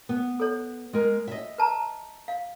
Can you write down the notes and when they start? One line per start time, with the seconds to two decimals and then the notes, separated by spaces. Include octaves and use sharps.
0.09 B3
0.40 A4 C#5
0.93 G#3 A#4
1.27 D#5 E5
1.58 B4 A5 A#5
2.28 F5